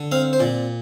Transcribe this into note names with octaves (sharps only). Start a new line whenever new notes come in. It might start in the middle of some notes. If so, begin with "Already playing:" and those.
Already playing: D3
C4 F5
C5
A#2 D5